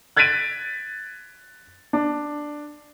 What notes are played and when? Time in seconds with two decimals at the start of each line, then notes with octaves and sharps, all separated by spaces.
0.16 F#6 G#6 A6 B6 D7 D#7
1.93 D4